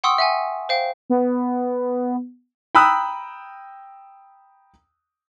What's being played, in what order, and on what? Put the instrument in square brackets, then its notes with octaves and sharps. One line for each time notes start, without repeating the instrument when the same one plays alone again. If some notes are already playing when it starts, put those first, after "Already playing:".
[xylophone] F#5 G5 C6 C#6 D#6 E6
E5 F#5 G#5
C5 F5 G5
[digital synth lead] B3
[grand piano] G5 A#5 B5 D#6 E6 F#6